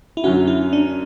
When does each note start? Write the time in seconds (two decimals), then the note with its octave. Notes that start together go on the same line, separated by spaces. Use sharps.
0.17 E4
0.24 F#2 D3 F#3 C#4 F#4
0.47 E4
0.73 D4